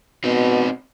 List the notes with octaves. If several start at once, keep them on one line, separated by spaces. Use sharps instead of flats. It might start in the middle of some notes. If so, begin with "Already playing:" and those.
B2 C4 D#4